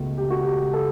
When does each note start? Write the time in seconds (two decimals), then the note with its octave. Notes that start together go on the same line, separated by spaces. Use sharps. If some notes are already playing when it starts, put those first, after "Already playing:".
Already playing: C#2 B2 A3
0.18 G4
0.30 F#4
0.43 G4
0.73 A4